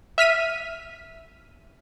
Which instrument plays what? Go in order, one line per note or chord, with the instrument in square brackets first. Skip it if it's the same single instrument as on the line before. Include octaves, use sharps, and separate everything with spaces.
[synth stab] E5 F6 B6 D#7